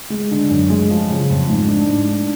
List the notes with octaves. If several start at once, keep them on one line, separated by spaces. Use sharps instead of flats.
G#3
D3
F#2
G#3
F3
C#3
F2
G#2
D4
G#2
D4